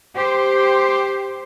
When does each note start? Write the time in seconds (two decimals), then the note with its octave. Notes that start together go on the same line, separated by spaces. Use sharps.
0.14 G4 C5